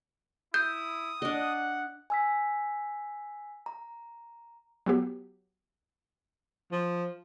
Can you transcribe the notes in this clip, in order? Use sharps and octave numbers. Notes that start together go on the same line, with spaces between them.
E4 D#6 G6
D4 D#5 F#5
G#5 E6 B6
A#5
F#3 B3 G4
F3